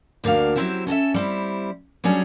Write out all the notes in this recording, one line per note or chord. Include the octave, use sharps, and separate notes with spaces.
D2 A#3 D4 F#4 F5
F#3 A3 C4 E4 G4 E5
C#4 A4 D#5 E5
G3 C4 E4
F#3 G3 C#4 D4 G#4